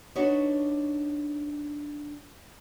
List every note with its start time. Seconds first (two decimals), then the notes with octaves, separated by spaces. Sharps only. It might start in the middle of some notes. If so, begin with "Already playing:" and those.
0.15 D4 D#4 F#4 B4 C#5